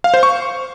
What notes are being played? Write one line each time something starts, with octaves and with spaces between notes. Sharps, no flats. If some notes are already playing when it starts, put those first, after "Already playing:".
F5
C5
C#6